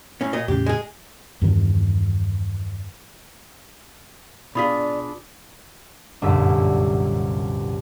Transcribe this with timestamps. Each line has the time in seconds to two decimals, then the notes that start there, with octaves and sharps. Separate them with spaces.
0.21 A2 C#4
0.33 A#2 D#5
0.48 E2 A2 C#3 G4
0.66 G#3 G#4
1.42 E2 G2 D#3
4.55 B2 D4 F4 G#4 D5 B5 D#6 B6
6.22 G1 C2 F#2 A#2 E6 B6